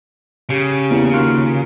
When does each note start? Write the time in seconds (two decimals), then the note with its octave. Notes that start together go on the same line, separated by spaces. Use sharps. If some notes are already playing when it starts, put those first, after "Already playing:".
0.50 C#3 G4
0.90 E2 A#3
1.13 D#2 F4 F#4 A#4